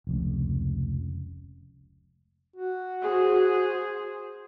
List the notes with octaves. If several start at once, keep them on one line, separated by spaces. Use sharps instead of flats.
F1 C#2
F#4
G#4 C5